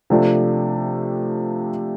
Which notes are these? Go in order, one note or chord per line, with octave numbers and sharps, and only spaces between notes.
C3 F3 A3 D4 G4